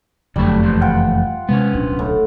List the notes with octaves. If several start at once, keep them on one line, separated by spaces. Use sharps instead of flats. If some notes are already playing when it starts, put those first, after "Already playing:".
F#1 F2 D3 F#3 G3 A3
E3 F3 A3
F4 F#5 G5
C3 G#3 B3 C#4
D1 B1 D4
A2